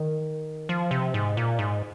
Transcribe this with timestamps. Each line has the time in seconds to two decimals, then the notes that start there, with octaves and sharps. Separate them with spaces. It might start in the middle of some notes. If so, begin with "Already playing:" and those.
Already playing: D#3
0.69 F3
0.91 C3
1.14 G#2
1.37 A#2
1.59 G#2